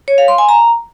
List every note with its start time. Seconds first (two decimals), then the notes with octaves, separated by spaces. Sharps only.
0.08 C#5
0.18 F5
0.28 C6
0.38 G#5
0.49 A#5